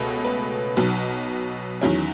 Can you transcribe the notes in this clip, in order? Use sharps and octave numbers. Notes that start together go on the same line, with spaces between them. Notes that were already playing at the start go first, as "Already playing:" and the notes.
Already playing: C#2 B2 A3 C#4
B4
B1 B2 F#3
E2 D#3 F#3 C#4